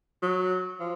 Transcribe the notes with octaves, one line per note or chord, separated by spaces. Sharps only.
F#3
F3